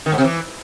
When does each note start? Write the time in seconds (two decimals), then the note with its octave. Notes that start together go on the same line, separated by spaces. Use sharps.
0.06 D#3
0.12 G#2
0.18 C3
0.24 E3